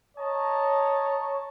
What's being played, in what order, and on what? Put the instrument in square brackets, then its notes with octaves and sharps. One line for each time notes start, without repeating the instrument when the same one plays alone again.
[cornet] C#5 [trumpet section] D#5 A5 A#5